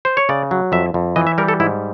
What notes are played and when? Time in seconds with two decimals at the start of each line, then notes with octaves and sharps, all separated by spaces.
0.05 C5
0.17 C#5
0.29 C#3 D5
0.51 F#3
0.72 F2 E5
0.94 F2
1.16 E3 D#5
1.27 E5
1.38 G3 A#4
1.48 A4
1.60 G#2 E4